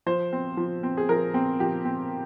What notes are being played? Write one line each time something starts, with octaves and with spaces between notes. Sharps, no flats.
F3 C5
C4
F3
C4
G#4
F3 A#4
C4
F3 G4
C4